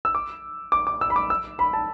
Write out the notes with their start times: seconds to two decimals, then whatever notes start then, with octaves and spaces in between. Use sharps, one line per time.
0.05 E6
0.15 D6
0.72 D6
0.87 D6
1.01 E6
1.10 B5
1.16 D6
1.30 E6
1.59 B5
1.73 A5